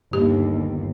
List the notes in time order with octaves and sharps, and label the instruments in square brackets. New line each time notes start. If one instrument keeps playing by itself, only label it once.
[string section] G1 D#2 [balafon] G4